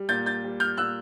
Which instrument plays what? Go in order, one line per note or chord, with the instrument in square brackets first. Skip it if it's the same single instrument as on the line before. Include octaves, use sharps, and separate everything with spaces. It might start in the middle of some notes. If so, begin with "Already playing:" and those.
Already playing: [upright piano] G3
A#2 G6 A6
G6 A6
G3
F6 G6
A#2 E6 F#6